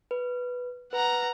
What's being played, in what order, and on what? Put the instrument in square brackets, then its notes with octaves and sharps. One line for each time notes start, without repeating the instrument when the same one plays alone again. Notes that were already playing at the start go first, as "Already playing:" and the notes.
[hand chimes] B4
[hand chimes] B4 [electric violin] F#5 A#5